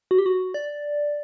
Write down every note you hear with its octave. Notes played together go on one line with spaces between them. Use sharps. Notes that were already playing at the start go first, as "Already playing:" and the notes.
F#4
G4
F#4
D5